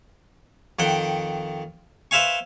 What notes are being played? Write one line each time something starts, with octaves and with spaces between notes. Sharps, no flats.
F2 D#3 F#5 G5
B4 C5 E5 F5 G#5 C#6